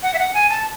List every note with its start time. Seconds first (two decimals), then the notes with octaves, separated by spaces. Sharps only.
0.03 F#5
0.14 E5
0.19 F#5
0.34 G#5
0.50 A5